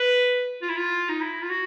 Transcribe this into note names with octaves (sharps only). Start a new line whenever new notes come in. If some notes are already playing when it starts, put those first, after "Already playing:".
Already playing: B4
F4
E4
F4
D#4
E4
F4
F#4